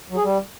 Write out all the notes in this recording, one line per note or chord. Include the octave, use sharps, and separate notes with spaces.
F#3
G#4
G3